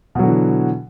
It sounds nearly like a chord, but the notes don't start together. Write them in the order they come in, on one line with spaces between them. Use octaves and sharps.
B2 F#3 D3 E3